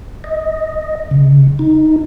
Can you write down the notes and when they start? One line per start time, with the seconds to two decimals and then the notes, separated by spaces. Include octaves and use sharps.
0.24 D#5
1.11 C#3
1.59 D#4